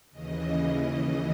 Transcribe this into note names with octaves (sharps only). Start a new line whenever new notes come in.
D#2 C#3 E3 D#5